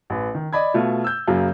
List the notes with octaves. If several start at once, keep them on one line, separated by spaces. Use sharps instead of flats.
A1 B4
D#3
D5 D#5 B5 G#6
B2 A3 F4
E6 G6
F#2 C#3 F#3 A#3